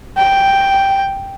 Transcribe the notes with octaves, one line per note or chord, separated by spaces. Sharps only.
G5